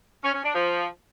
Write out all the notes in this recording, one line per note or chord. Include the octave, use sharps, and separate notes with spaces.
C#4
C#4
D4
F3